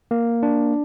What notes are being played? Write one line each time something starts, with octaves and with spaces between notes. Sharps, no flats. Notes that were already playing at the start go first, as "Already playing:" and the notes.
A#3
D4